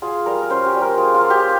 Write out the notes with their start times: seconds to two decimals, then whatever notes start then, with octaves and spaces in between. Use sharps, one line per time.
0.02 F4 G#4
0.26 G3 A#4
0.42 A#4
0.50 C#4 C5
0.66 G4
0.74 G3
0.82 A#4
0.98 F4 G#4
1.14 F4
1.21 A#3
1.30 G4